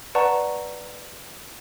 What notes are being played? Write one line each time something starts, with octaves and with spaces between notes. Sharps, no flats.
B4 D5 F#5 A5 A#5 C#6